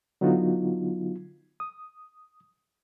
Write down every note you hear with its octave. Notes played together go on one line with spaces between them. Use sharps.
D3 F#3 B3 D#4 F4 F#4
D#6